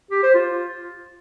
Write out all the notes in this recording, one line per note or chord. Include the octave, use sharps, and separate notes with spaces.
G4
C5
F4